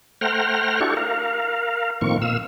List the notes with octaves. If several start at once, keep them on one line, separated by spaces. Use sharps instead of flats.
A3 C5 F#5 G5 A#5 F6
D4 E4 F#4 G4 A4 C#6
A#4 F5
A2 D#3 F3 A#3 C4 C#6
A#2 F5 E6